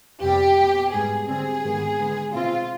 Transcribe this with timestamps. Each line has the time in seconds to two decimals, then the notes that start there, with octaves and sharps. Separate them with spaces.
0.21 F2 C3 G3 B3 G4
0.57 B2 B3
0.92 G#2 G3 B3 G#4
1.27 D3 G3 C4 G#4
1.63 G#2 D#3 B3
1.98 D3 G#3 B3
2.34 B2 G#3 C4 F4